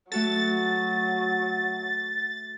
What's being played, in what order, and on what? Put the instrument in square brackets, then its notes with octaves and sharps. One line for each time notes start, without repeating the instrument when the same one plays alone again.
[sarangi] F#3 [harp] A3 F#4 A4 [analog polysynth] A6